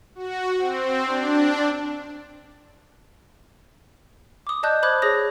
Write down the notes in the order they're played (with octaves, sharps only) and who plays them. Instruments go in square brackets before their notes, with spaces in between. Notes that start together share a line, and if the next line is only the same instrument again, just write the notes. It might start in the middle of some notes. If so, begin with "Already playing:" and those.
[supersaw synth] F#4
C4
D4
[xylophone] D6 D#6
D5 D#5 A5 F#6 G6
C5 B5 D6 D#6 F#6 G#6
G#4 C#5 D#6 A#6